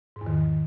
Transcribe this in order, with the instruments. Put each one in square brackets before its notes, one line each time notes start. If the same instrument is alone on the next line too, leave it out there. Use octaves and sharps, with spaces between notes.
[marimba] G#2
E2
D#3